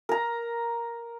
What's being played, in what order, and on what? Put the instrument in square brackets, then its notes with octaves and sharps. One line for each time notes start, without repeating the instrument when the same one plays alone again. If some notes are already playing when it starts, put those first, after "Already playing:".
[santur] A#4 A#5